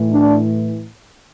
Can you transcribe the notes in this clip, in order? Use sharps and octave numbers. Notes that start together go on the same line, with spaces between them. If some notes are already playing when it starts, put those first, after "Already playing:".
Already playing: A2 E3
D4